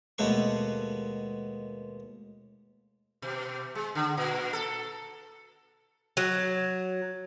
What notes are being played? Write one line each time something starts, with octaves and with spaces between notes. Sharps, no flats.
D#2 B2 G#3 A3 B4 C#6
B2
G#3
D3
A#2
A4
F#3